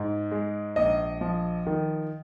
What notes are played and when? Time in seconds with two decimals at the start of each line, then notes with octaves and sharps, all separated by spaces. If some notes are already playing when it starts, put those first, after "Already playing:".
Already playing: G#2
0.32 G#3
0.76 A#1 D#5
1.21 F3
1.67 D#3